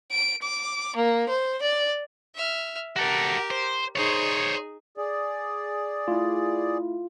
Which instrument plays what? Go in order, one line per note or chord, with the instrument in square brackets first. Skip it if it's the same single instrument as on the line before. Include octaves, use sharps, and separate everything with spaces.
[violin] D7
D6
A#3
C5
D5
[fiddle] E5 F6
[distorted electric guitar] F#4 A4 [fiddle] G4 A#4
[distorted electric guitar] C5
[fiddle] D#4 G#4 [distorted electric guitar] C5 C#5
[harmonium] G#4 D5
[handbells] A3 E4 [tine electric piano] F4